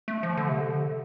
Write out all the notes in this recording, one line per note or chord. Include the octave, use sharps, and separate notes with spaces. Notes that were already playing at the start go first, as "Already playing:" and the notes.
A3
F3
D3
C3
D3